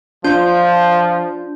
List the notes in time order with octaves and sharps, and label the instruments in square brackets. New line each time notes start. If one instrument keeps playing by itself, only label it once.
[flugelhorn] F3 [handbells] D4 F4 G6